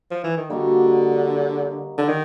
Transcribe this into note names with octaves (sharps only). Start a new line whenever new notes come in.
F3
E3
D#3
D3 G3 A#3 D#4 F#4
D3
D#3